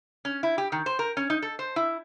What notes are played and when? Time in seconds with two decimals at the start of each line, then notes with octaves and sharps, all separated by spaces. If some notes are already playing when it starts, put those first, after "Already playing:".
0.25 C#4
0.43 E4
0.58 G4
0.72 D#3
0.86 C5
0.99 A#4
1.17 C#4
1.30 D#4
1.42 A4
1.59 C5
1.76 E4